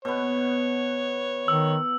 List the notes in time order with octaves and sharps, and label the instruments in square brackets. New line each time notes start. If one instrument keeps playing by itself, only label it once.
[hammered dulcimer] B2 B3 [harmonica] C#5
[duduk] D#3 [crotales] E6